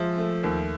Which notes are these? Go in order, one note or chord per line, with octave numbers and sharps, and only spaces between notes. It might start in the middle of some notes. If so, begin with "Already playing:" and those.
Already playing: F3 G#3 E5
A3
D#2